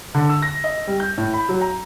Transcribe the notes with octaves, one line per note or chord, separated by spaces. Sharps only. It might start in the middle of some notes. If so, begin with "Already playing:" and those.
D3
E6
A#6
D#5
G3
G6
A2
B5
F#3
A#5